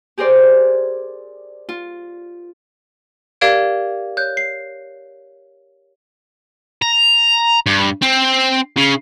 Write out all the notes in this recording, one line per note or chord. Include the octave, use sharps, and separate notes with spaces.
G4 G#4 A#4 C5 D5
F4
G4 A#4 D5 F5 G#6 D7
C#5 F#6 G6
C7
A#5
G2
C4
C#3